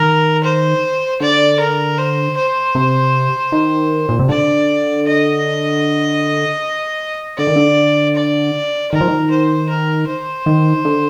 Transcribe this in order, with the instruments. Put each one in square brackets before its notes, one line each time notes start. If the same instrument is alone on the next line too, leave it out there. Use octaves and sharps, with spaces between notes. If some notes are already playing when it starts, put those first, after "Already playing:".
Already playing: [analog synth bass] D#3 [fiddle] A#4
[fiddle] C5
[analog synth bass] D3 [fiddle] D5
[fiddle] A#4
C5
C5
[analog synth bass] C3
D#3
A#2
C3
[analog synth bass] D3 [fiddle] D5
[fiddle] D#5
[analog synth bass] D3 [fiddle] D5
[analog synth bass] D#3
D3
[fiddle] D5
[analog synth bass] D#3 [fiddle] A#4
[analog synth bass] F3
D#3
[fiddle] C5
A#4
C5
[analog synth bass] D#3
D3